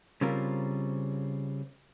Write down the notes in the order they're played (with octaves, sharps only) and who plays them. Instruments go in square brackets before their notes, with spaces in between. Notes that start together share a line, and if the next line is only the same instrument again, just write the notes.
[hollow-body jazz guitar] C#3 G3 C4 F4 A#4